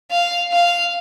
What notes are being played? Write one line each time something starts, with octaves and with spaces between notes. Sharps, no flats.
F5
F5